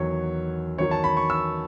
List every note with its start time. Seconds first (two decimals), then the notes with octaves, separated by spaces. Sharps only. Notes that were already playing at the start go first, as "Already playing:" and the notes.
Already playing: E2 D#3 F#3 C#5
0.78 E2 D#3 F#3 C#5
0.91 A5
1.04 B5
1.17 C#6
1.30 E6